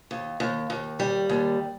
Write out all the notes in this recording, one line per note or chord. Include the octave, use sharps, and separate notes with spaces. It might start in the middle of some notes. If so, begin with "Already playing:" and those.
D#2
D#2
D#2
G3
D#2